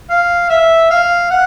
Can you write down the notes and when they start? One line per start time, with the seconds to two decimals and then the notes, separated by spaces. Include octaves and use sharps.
0.10 F5
0.50 E5
0.91 F5
1.31 F#5